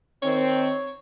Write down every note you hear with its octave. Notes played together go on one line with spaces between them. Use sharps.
D#3 C4 C#5